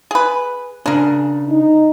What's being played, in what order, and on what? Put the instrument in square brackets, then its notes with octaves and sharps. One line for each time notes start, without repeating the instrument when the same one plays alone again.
[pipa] G#4 B4
[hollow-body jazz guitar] C#3 D4 [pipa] G#4 A#4
[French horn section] D#4